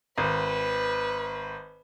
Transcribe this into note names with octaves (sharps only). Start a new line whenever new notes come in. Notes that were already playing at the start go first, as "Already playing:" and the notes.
G#1 B4